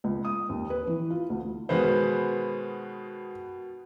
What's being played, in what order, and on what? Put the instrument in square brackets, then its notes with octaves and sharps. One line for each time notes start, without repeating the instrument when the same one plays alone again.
[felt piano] C#2
D#6
D#2
B4
E3
F4
D2
[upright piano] B2 D#3 B3 [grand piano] G#3 B4 C5